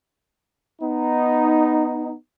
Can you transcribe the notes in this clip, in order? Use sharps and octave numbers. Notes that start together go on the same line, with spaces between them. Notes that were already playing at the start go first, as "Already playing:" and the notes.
B3 D#4